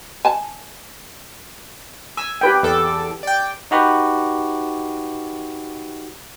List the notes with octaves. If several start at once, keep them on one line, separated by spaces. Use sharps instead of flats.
G#5 A5
G#5 E6
G4 B4 G5
E2 A4 D6
D5 G5
D#4 F#4 G4 B4